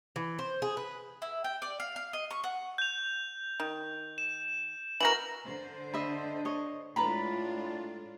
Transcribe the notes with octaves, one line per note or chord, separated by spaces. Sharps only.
E3
C5
G#4
B4
E4
G5
D5
F5
F5
D#5
C#6
F#5
G6 F7
D#3
E7
E3 F#4 A#4 A#6 F#7
D3 C5
D4 D#5 E5 B5
C#5 D#5
A2 G#3 D4 F4 B4 A#5 B5